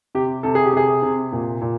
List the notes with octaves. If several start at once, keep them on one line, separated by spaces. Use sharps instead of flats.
C3 G4
C3 A4
G#4
G4
C3 G#4
C3
A#2
A#2